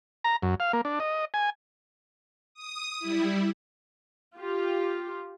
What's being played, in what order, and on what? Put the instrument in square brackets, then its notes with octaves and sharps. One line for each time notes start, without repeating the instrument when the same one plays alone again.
[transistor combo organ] A#5
F#2
F5
A#3
D4
D#5
G#5
[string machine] D#6
G3 E4
[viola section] F4 G4